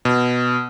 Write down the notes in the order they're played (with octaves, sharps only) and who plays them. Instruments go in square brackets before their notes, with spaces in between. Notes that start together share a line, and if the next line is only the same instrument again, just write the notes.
[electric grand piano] B2